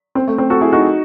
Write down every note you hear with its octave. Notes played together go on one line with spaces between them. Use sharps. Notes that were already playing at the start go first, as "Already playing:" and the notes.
C4
A3
C4
F#4 A4
E4 G#4
D#4 F#4